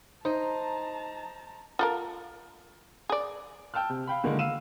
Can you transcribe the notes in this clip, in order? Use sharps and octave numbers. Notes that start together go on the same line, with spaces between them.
D#4 C5 A5 A#5
F4 A4 A#4
G#4 D5
G5 A5 E6 F6
C3
F5 G5 B5
A#2 D3 D#3 G#3 A#3
F5 E6 D#7 E7